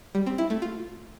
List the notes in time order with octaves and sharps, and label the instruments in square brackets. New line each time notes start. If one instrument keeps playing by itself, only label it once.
[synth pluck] G3
C4
E4
A3
F4